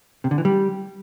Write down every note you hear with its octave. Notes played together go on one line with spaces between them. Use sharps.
C3
D3
E3
G3